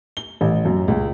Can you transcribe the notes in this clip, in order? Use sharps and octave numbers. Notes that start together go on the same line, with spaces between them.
G7
A1
F#2
C#2